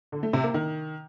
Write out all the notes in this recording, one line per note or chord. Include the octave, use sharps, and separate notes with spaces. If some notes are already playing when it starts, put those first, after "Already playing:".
D3
A3
C3
A#3
D#3